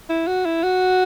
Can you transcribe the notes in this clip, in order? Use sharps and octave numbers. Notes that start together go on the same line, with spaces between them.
E4
F#4
E4
F#4